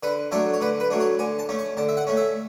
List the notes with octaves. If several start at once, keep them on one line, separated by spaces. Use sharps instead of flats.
D3 B4
F#3 A3 D4 A4
C#5
D3 B4
B4
F#3 A3 D4
C#5
D3 G#5
A5
A3 C#4
C#6
D3 A5
E5
F#5
A3 C#4
E5